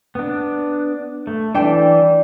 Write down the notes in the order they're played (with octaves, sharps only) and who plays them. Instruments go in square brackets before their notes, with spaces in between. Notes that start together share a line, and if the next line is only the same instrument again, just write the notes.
[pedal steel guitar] B3 D4
A3
[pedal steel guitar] E3 [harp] D4 G5